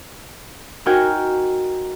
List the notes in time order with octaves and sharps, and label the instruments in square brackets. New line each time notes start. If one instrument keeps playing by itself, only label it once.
[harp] D#4 F#4 A#4 G5 G#5